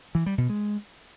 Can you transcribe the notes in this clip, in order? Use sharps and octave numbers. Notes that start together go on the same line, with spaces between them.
E3
G3
B2
G#3